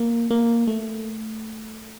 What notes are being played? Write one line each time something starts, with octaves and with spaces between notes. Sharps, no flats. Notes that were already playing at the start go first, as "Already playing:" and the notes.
Already playing: A#3
A#3
A3